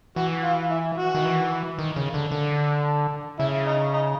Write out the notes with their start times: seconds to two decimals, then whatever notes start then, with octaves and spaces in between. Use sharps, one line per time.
0.16 E3 F#4
0.44 F4
0.71 E4
0.98 F#4
1.15 D#3
1.25 E3
1.79 D#3
1.96 C#3
2.14 D3
2.32 D3
3.39 C#3 E4
3.67 D#4
3.94 D#4